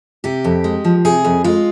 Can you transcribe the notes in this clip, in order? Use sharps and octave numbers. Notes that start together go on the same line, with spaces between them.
C3 G4
F2
G#3
F3
C3 G#4
F2
G#3 F4